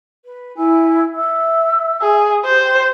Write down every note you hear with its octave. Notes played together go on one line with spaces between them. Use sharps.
B4
E4 G#5 E6
E5 E6
G#4
G4 C5